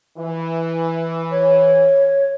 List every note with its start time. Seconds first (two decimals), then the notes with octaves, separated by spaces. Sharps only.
0.17 E3
1.31 C#5